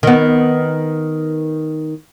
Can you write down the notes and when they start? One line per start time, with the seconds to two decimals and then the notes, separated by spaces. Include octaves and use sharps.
0.03 D#3 B3